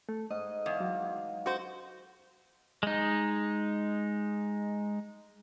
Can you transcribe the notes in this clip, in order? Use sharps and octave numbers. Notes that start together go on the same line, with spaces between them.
A3
G#2 D#5
E2 F5
F#3
F#4 C5
G#3 D#4